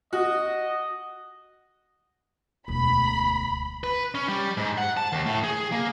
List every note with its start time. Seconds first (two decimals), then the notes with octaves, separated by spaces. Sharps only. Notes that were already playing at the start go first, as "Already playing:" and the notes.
0.13 F#4 D#5
2.68 E1 D2 B5
3.84 B4
4.15 C#4
4.28 G3
4.57 G#2
4.78 F#5
4.97 A5
5.13 D#2
5.26 A2
5.44 G#4
5.72 A#3